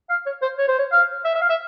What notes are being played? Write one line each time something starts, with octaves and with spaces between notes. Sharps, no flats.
F5
C#5
C5
C#5
C5
C#5
F5
E5
E5
F5
E5